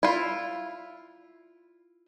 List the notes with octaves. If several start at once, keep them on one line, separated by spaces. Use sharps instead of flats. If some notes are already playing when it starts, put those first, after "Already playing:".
E4 F4